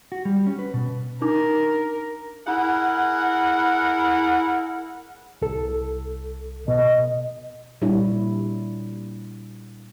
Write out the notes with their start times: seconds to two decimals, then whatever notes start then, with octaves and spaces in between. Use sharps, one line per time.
0.12 F#4
0.25 G3
0.47 C#4
0.59 B4
0.74 B2
1.22 D4 D#4 A#4 D6
2.47 E4 G#4 A#4 F#5
5.42 C2 A4
6.68 B2 D#5
7.82 A#2 G3 D4 E4 C#5